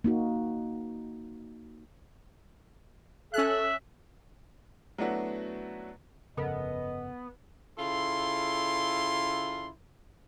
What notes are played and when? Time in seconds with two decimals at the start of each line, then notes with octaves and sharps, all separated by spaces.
0.04 A#3 D#4 F#4
3.34 C#4 A4 E5 F#6
4.98 F#3 A3 B3 D4 E4 F#4
6.37 G1 F2 C#3 B3 A4 A#4 D#5
7.78 C#3 E4 F4 A4 C6